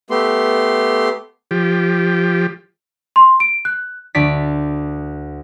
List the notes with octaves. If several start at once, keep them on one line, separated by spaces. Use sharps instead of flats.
A3 B3 G4 C6
F3 G4
C6
D7
F#6
D2 D5 B6